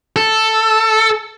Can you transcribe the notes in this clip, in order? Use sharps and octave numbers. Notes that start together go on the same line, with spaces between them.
A4